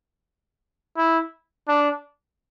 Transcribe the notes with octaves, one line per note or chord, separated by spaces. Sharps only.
E4
D4